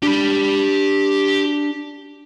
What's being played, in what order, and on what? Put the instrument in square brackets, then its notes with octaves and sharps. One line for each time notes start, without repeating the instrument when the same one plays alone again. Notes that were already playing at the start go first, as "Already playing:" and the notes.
[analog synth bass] D4 [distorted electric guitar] G4 B5